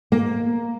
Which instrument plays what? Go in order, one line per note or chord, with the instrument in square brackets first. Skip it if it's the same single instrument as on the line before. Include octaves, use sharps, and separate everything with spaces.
[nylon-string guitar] A#3